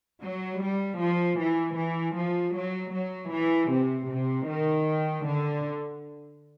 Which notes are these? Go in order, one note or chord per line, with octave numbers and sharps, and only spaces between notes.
F#3
G3
F3
E3
E3
F3
F#3
F#3
E3
C3
C3
D#3
D3